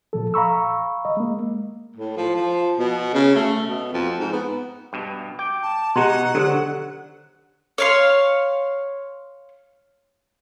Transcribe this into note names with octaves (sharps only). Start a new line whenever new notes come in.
A#2 F3 A4
F5 A#5 B5 C#6 E6
D#5
G#3 A#3
A2
F3
F3
B2
C#3
A3
B2
F2
G#2
B3
G2 B2
G5 D6
A5
B2 G#3 D#4 F#4 G4 F#5 A#5 C6
D3 F#3 G4 A4 C5
C#5 F5 C6